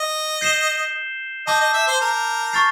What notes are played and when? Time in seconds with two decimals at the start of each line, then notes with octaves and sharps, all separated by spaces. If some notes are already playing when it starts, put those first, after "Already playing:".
Already playing: D#5
0.41 G6 C7 E7 G7
1.47 D#5 A5 D6 G6
1.60 D#5
1.74 E5
1.88 C5
2.01 A#4
2.53 C#6 F6 A6 C7